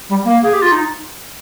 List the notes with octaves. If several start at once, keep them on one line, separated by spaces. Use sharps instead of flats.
G3
A#3
G#4
G4
F4
D#4